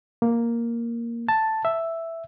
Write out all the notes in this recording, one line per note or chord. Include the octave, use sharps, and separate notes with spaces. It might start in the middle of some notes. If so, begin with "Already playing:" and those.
A#3
A5
E5